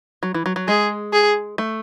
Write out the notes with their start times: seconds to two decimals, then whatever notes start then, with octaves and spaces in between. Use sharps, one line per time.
0.23 F#3
0.34 E3
0.46 F#3
0.56 F#3
0.68 G#3 G#4
1.13 G#4
1.58 A3